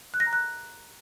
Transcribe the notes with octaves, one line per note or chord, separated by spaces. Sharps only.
F#6
A#6
A#5
F#6